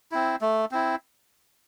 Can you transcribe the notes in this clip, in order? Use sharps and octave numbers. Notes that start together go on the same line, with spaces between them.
C4 E4
A3
C4 E4